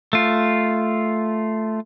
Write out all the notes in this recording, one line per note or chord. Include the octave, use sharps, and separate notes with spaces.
A3 F4